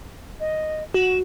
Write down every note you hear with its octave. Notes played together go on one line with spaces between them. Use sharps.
D#5
F#4 E7